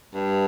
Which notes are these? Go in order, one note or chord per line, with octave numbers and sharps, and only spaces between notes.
G2